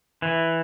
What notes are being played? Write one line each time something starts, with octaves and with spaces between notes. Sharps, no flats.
E3